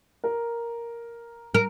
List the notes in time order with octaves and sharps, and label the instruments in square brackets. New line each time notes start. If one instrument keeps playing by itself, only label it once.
[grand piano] A#4
[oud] A#4